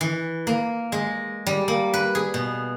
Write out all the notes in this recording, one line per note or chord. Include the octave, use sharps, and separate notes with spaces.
E3
A#3
G#3
G3
A#3
B4
G#4
B2